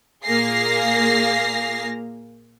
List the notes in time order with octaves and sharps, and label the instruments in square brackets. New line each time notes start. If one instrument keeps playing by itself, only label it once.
[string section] A#2 A#3 G#4 F5 A#6 C7